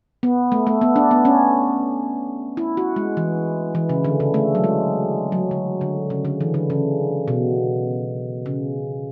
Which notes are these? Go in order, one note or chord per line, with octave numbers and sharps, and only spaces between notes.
B3
A3
A3
B3
D4
B3
C#4
E4
F#4
G#3
E3
E3
C#3
D3
C#3
A3
F#3
G#3
F#3
D3
D3
C#3
D3
E3
D3
C#3
B2
C#3